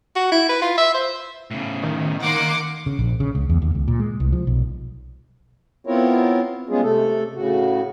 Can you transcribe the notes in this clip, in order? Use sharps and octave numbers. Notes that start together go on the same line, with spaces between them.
F#4
E4
B4
F4
E5
C5
A2 C#3
D#3
A#3 F#5 C6 D6
C#3
A#1
C#3
C#2
E2
D#2
C#2
A#2
G#3
C2
F3
B1
B3 C4 E4 F4 A#4 C#5
G3 G#3 B3 C#4 F4 G#4
C3 A3 A4
A2 C#3 F#4